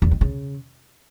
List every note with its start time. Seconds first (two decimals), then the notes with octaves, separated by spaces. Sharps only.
0.02 E2
0.11 D#3
0.21 C#3